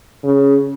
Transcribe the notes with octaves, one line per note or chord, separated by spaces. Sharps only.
C#3